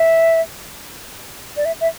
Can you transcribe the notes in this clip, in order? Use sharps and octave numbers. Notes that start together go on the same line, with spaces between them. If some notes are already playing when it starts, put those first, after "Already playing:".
Already playing: E5
D5
E5
E5